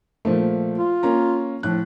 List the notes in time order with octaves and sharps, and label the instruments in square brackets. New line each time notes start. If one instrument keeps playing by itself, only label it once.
[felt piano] A#2 F3 A3
[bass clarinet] F4
[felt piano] A#3 C#4 A#5
[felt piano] A2 F#6 [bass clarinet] F3